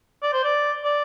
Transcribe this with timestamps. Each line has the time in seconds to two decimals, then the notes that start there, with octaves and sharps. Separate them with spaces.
0.22 D5
0.33 C5
0.44 D5
0.84 D5